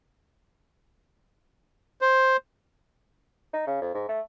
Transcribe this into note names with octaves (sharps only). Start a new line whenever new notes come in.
C5
D#4
C#3
F2
G#2
A3